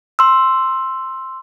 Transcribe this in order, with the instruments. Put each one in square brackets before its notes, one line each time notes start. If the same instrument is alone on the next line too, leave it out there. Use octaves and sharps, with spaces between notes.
[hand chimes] C6 E6